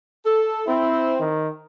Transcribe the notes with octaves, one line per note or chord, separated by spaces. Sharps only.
A4
C4 E4
D#3